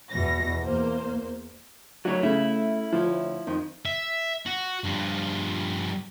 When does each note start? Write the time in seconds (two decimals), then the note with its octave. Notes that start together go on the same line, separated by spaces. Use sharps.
0.11 E2 B2 E3 A#6
0.64 E2 A#3 C5
2.05 F#3 A3 C#4 F#4 C#5
2.23 C#3 A3 E4
2.92 D2 F3 C#5
3.47 F2 D#3 F3
3.86 E5
4.46 F#4
4.84 G2 F3